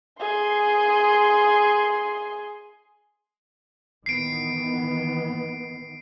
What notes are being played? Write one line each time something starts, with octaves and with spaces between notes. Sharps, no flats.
G#4 C6
D#3 E3 B3 C7 D7